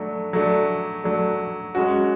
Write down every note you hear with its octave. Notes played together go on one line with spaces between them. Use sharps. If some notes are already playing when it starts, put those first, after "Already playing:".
Already playing: F#3 A3 D4
F#3 A3 D4
F#3 A3 D4
G#3 C#4 F#4